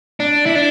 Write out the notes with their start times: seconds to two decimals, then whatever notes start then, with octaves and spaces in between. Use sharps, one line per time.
0.20 D4
0.46 E4
0.55 D4